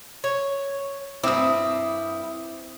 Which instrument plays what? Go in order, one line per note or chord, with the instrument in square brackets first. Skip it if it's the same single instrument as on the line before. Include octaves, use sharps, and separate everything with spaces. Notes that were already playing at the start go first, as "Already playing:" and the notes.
[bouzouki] C#5
[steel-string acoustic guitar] G2 E4 [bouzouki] C4 [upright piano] D6 D#6